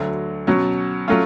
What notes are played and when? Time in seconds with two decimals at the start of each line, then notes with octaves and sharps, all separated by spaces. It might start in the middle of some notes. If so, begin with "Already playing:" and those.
Already playing: D2 D3 F#3
0.47 B2 F#3 C#4
1.08 F#3 A3 C#4 F4